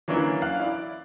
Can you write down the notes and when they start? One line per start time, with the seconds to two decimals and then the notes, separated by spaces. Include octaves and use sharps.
0.08 E3 F#3 A#3 C#4 D4 E4
0.42 F5 F#6
0.59 E4 D5